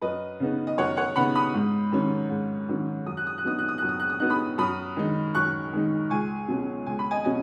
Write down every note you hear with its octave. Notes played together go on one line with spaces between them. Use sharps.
F#2 B4 D#5
C#3 B3 D#4
D#5
F#2 C#5 F#5
C#5 F#5
C#3 B3 D#4 F#5 B5
B5 D#6
G#2
D#3 F#3 C#4
G#2
D#3 F#3 C#4
F#2 D#6
F#6
D#6
F#6
F#3 B3 D#4 D#6
F#6
D#6
F#2 F#6
D#6
F#6
D#6
F#3 B3 D#4 F#6
B5 D#6
F#2 B5 D#6
D#3 G#3 D#4
F#2 C#6 F#6
D#3 G#3 D#4
C#2 G#5 C#6
B2 F#3 C#4
C#2 G#5
B5
D#5 G#5
B2 F#3 C#4 D#5 G#5